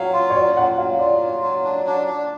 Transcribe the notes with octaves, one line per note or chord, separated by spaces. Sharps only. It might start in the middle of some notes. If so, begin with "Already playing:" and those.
Already playing: F#3 F5
F4
C#5
F#3 D5
F#3 F#5
F#3 F5
F4 D5
F#3
F#3
D4
D4
D4